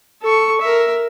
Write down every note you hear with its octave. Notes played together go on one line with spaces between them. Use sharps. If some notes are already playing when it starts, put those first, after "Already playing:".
A4 C#6
A#4 E5